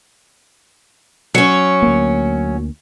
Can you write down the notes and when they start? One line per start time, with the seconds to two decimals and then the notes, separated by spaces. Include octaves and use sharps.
1.35 F#3 C#4 C#5
1.82 D2 A#3